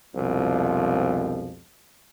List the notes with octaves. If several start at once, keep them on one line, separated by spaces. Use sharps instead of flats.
C2 F2 B2 D3 F3 G#3